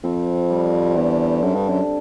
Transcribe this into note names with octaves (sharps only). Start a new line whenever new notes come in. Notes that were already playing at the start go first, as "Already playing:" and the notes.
F2 C4
G3
E2 D3
F#2 D3
G2
F#2